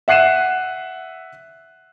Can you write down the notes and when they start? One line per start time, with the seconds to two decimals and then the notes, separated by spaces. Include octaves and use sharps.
0.08 E5 F#5 F#6 C7 D#7 E7